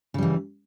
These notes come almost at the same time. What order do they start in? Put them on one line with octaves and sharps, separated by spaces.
C#3 G3 E3